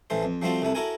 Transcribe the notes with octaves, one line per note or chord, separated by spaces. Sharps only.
A1 E3 A3 C5
F2
F3 G3 A3 C4 F4 F#4
C2 C3 A3 E4
E4 F#4 A4 A#4 G#5